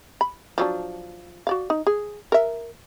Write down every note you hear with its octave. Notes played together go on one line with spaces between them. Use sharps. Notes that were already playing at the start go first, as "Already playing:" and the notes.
B5
F3 F#3 D4
F#4 D5 F5
D#4
G#4
A#4 E5